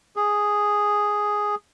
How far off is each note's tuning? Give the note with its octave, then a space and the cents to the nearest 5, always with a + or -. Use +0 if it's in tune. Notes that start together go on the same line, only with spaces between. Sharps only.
G#4 +0